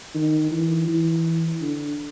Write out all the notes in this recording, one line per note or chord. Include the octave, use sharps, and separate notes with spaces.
D#3
E3
E3
D3